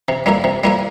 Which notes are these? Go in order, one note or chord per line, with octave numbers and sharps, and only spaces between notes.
C3
G3 A#3 E4 A#4
C3
G3 A#3 E4 A#4